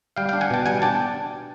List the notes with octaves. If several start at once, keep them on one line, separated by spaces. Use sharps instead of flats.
G3 F5 G5
F5 G5
D4
F#5 G#5
B2 G5 A5
G3 F#5 G#5
D4 G5 A5